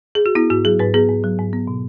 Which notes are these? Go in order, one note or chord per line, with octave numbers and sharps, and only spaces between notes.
G#4
F#4
B3 E4
G#2 F#4
F#3 G#4
G#2 B4
B3 G#4
G#2
F#3
G#2
B3
B2